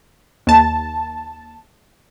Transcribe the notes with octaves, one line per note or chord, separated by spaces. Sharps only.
D#2 A5